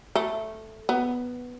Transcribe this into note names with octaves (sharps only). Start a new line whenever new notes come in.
A3
B3